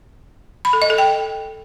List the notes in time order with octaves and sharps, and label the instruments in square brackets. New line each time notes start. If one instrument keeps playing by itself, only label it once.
[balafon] B5
A4
D#5
A4
G5